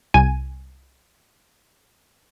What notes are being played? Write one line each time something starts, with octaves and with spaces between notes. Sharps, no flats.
C2 G#5 D#7